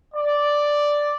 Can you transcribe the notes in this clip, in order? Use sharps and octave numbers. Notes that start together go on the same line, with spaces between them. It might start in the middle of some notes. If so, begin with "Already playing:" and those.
D5